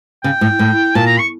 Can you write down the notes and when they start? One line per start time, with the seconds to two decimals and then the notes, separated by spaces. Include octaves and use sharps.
0.23 C#3 G5
0.41 A2
0.59 A2
0.95 A#2 A5
1.06 A#5
1.19 C#6